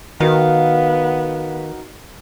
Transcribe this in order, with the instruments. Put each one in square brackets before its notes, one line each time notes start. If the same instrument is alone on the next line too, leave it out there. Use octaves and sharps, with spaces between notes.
[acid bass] D#3 [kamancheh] B3 [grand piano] D#4 F#4 A#4 [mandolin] F5